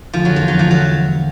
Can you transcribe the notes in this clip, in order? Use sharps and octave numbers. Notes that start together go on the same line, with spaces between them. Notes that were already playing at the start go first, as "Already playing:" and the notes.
D2 F3
F#3
E1 F3
F#3
D2 F3
F#3